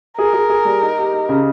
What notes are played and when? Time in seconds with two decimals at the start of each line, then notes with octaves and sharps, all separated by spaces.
0.18 G#4 A#4
0.33 G#4
0.50 G#4
0.65 G3
0.82 D#4
0.97 G4
1.13 D#4
1.29 C#3